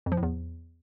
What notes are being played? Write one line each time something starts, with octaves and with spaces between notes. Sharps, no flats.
F2
F3
A2
E2